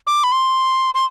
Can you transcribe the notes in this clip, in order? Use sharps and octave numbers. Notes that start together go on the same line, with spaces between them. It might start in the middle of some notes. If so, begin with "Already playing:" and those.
D6
B5
C6
C6